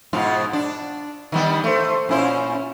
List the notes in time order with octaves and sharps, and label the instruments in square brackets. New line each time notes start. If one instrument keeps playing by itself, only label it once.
[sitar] G#2 B2 F4
D4
D#3 G3 B3
[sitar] A3 [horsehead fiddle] C5
[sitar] A#2 E4 C5 [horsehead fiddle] C#4